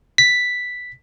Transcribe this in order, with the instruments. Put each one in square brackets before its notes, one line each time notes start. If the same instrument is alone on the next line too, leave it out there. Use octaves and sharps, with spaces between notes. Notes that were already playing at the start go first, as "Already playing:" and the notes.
[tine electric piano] B6